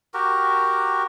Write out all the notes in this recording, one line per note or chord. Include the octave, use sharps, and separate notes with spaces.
F#4 G4 A#4